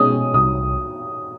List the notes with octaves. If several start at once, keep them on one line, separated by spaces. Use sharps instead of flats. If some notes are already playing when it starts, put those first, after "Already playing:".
Already playing: B2 G#3 C#4 D#6
C2 D#6